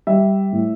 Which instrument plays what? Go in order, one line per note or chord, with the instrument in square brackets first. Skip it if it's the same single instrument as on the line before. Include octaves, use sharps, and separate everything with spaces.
[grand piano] G3 E5
A2